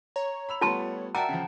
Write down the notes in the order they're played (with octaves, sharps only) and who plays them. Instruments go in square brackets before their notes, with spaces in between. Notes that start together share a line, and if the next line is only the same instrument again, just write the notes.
[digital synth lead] C#5 [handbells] A#5
[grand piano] B5 E6 F7
[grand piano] G3 A3 B3 [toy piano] F4 A5 C6
[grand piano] F#4 A#4 D5 [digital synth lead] E5 [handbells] F#5 G5 A5 [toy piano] A#5
[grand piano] C#3 F3